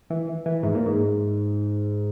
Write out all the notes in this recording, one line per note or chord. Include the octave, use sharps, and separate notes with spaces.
E3
E3
G#2
A#2
G#2